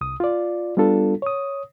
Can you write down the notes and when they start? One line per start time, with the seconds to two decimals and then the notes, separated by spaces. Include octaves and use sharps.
0.01 C2 D#6
0.20 F4 D5
0.77 G3 B3 D4 F4 A4
1.22 C#5 D#6